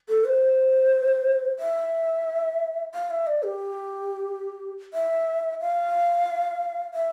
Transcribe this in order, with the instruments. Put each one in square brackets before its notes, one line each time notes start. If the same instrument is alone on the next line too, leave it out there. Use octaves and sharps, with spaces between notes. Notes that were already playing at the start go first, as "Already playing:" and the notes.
[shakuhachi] A4
C5
E5
F5
E5
D5
G4
E5
F5
E5